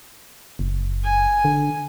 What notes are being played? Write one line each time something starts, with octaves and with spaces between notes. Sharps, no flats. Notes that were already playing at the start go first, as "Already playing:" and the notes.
F#1
G#5
D3